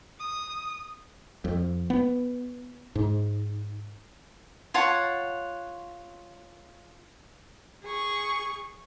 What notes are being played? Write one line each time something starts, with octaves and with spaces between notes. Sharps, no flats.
D#6
F2
B3
G#2
F4 C#5 F#5 A5
G#4 C#6